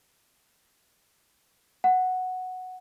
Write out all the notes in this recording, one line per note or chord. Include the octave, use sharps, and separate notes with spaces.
F#5